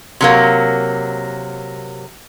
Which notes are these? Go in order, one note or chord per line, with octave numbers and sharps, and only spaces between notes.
C3 F#3 A#3